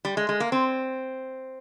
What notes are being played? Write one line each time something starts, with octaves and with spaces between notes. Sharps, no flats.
G3
G#3
G#3
A#3
C4